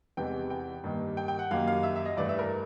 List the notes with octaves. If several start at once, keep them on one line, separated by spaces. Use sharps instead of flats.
E2 C3 E3 G#3 G5
G5
G2 D#3 G3 A#3
G5
G5
F#5
F#2 D#3 G3 A#3 F5
F5
E5
E5
D#5
G2 E3 A3 D5
E5
A#4